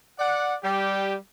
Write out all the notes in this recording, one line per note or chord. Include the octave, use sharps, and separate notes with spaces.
D5 F#5
G3 G4